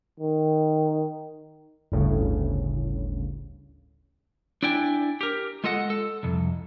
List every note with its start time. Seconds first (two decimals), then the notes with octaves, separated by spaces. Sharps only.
0.20 D#3
1.92 G1 D2 A2 C#3
4.63 D4 E4 D5 G5 G#5
5.21 G4 A#4
5.64 G#3 F4 A4 D#5 F#5
5.90 A4
6.23 C2 F2